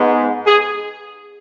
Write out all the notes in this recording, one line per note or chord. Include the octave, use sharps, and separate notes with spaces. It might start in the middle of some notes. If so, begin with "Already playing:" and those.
Already playing: G#2 G#3 B3
G#4